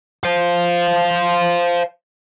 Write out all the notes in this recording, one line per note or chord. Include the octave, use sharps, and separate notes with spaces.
C5 F5